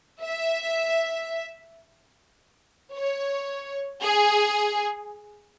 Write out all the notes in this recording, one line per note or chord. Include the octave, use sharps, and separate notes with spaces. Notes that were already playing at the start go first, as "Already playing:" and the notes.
E5
C#5
G#4